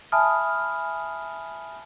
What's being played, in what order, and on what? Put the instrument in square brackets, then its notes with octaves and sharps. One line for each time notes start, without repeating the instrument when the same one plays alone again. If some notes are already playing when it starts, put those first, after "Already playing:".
[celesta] E5 G#5 A5 B5 D#6 F6